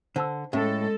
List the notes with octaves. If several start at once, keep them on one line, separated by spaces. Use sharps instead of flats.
D3 C5 A5 E6
A2 G#3 C#4 A4